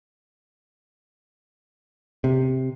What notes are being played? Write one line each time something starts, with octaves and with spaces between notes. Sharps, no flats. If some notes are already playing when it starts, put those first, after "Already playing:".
C3